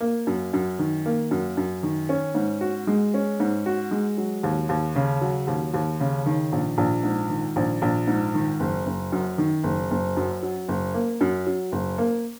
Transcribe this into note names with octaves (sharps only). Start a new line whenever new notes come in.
A#3
F#2
F#2
D#3
A#3
F#2
F#2
D#3
C#4
G#2
F#4
G#3
C#4
G#2
F#4
G#3
F#3
D#2
D#2
C#3
F#3
D#2
D#2
C#3
D#3
A#1
A#1
G#2
D#3
A#1
A#1
G#2
D#3
F#1
F#1
F#2
D#3
F#1
F#1
F#2
F#3
F#1
A#3
F#2
F#3
F#1
A#3